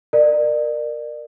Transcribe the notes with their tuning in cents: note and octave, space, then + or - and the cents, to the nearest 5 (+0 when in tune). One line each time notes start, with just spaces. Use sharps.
A#4 +0 D5 +30